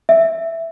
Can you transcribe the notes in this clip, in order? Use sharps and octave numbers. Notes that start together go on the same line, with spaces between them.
E5